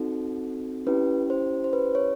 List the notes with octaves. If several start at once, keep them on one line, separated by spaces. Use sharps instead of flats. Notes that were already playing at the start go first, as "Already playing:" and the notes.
Already playing: C4 D#4 F#4 A4
C#4 E4 G4 B4
C5
C5
B4
C#5